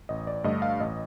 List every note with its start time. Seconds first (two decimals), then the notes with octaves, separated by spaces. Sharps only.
0.09 A1 D#5
0.27 D5
0.44 G2 D3 A3 D#5
0.62 F5
0.80 A1 D#5